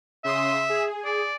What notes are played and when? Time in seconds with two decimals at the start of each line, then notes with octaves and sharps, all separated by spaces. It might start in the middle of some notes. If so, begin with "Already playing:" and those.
0.24 C#3 E5 C6 D#6
0.69 G#4
1.05 D5